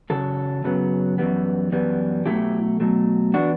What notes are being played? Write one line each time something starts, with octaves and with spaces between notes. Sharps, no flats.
F#2 C#3 F#3 A4
F#2 C#3 F#3 B3
F#2 E3 G3 B3
F#2 E3 G3 B3
B2 F#3 A3 E4 G4
B2 F#3 A3
E3 B3 D4 F#4